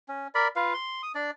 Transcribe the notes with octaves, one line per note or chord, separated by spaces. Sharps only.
C#4
A#4 D5 B5
F4 B4 F5
C6
D#6
D4 D5